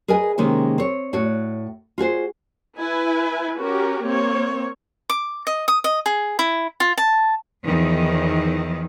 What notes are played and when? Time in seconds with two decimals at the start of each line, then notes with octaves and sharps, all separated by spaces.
0.08 G#4 A#4 B4 D#5 G#5
0.38 C3 D#3 G#3 A#3 C#4
0.78 C4 C#5
1.13 A2 F#4 C#5
1.98 F4 F#4 G#4 C5
2.78 E4 B4 G#5
3.58 C#4 F#4 G4 A#4
4.04 A#3 C4 C#5
5.10 D6
5.47 D#5
5.68 D#6
5.84 D#5
6.06 G#4
6.39 E4
6.80 F4
6.97 A5
7.65 E2 D#3 F3